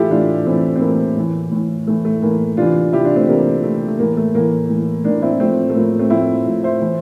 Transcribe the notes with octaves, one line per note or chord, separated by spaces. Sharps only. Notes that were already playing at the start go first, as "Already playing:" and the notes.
Already playing: A2 E3 E4 F4 G4 A4
A2 E3 D4 F4
A2 E3 A3 C4
C4
A2 E3 A#3
A2 E3
A2 E3
A2 E3 A3
A3
A2 E3 A#3
C3 E3 D4 F4
C3 E3 E4 G4
D4 F4
A3 C4
C3 E3 A#3
C3 E3 A3
A3
A2 E3 A#3
A3
A2 E3 A#3
A2 E3
A2 A#3 D4
E3
C4 E4
A2 F3 A3 C4
A3
A2 F3 A#3
A3 C4
A2 F3 C4 E4
A2 F3
C5 E5
A2 E3